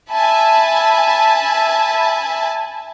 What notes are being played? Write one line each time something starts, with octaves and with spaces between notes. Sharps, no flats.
E5 G#5 A5 B5